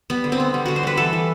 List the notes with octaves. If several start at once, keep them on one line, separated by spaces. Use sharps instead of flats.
G3 B3
D3
C4
B3
G3
D3 F#4
C5
G3 B4
E3 A4
E3